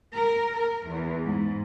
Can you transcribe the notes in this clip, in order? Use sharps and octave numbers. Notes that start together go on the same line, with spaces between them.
A#4
A#4
E2
G#2